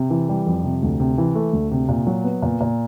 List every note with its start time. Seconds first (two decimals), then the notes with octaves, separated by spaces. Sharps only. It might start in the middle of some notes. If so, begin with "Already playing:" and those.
Already playing: C3
0.10 E3
0.29 G3
0.46 F2
0.64 C3
0.82 D2
1.00 C3
1.18 E3
1.35 A3
1.53 D2
1.71 C3
1.89 A#2
2.07 F#3
2.24 B3
2.42 A#2
2.61 A#2